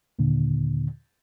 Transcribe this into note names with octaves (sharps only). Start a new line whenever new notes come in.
D#2 A#2 D3